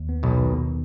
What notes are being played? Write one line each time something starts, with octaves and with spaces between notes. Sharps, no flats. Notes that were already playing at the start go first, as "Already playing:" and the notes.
Already playing: D#2
B3
B1 B2
D#3